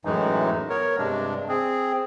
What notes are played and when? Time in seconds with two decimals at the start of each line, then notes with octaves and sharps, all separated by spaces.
0.05 F#2 A2 E3 G#3 D#4
0.70 B3 A#4 C#5
0.98 G2 C3 G#3 D4
1.48 C4 G#4